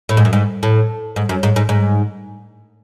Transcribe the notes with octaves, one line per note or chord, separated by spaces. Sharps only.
A2
G#2
F#2
G#2
A2
G#2
F#2
G#2
G#2
G#2